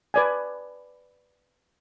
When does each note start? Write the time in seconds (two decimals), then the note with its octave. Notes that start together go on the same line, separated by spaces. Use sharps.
0.14 B4 D5 G#5